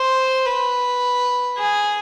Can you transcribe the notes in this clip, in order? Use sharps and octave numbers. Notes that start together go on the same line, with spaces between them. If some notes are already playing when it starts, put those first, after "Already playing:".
Already playing: C5
B4
G#4